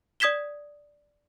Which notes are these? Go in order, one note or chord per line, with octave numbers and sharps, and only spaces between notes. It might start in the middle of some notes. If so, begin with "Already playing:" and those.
D5 D#6 G#6 B6 E7 G7